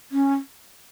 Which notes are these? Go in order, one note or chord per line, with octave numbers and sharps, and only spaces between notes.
C#4